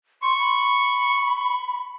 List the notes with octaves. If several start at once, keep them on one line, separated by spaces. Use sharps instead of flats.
C6 C#6
B5